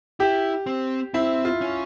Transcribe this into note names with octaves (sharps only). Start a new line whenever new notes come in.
E4 G4
C4
C4 E4
F4
C#4